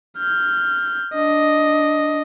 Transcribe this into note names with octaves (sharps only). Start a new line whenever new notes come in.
F6 G6
D4 D#5